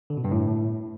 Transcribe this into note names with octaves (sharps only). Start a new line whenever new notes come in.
D3
B2
G2
A2